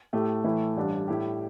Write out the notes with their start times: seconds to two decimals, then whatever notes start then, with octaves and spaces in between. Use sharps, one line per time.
0.13 A2 A3 G4
0.44 A2 E3 A3 E4
0.77 A1 G2 G3 D4
1.08 A2 G3 E4 G4